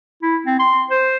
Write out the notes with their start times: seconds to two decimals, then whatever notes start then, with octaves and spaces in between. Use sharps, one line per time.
0.22 E4
0.46 C4
0.59 C6
0.90 C5